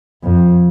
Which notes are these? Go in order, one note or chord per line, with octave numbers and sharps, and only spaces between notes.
F2